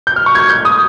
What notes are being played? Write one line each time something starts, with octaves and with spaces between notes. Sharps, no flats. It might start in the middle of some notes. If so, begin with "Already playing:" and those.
G6
F6
C#6
G#6
G6
D#6